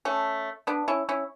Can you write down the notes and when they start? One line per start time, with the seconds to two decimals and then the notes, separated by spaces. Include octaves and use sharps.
0.05 A3 C#4
0.67 B3 D4
0.88 C#4 E4
1.09 C#4 E4